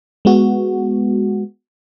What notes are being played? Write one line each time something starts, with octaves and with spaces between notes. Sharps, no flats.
G#3 B3 F#4